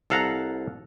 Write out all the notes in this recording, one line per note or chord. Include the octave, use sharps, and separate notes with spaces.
C2 A4 F5 F#5 A#5